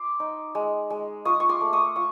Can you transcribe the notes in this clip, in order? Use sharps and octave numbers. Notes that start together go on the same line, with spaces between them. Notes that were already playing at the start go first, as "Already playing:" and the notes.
Already playing: C6 D6
D#4
G#3
G#3
F4 C#6 D#6
C#6
C6 D6
A3
C#6 D#6
F4 C#6